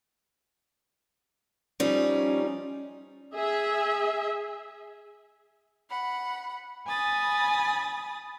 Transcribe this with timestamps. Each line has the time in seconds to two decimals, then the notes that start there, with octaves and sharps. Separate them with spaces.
1.80 F3 G3 C#4 D#4
3.34 G#4 E5
5.88 F#5 B5
6.87 G#5 B5 D#6 A6